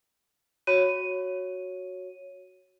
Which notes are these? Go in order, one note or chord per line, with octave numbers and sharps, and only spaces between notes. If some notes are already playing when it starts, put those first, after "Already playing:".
F#4 C#5 D#7